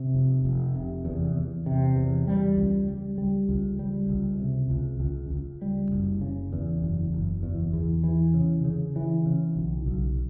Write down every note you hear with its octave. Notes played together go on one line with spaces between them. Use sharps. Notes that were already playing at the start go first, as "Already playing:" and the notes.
Already playing: C3
F1
F1
C3
E2
E2
C3
E2
G3
C#2
G3
G3
C#2
G3
C#2
C3
C#2
C#2
C#2
G3
F#1
C#3
E2
F#1
F#1
E2
E2
E3
C#3
C#3
E3
C#3
B1
B1